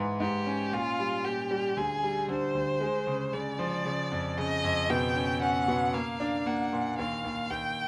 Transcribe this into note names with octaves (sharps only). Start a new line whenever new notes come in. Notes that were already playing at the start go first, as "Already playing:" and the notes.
Already playing: G#2 E3
G#2 G4
C#4
A#2 F4
G3
A#2 G4
G3
D2 G#4
G3
D3 C5
D2
G#3
C#3
C#3 D5
F3
C#3
F2
C#3 D#5
F2
B2 G5
C#4
C#4 F#5
B2
A#3 F5
D4
A#3 F#5
A#2
D#2 F5
D#2
D#2 G5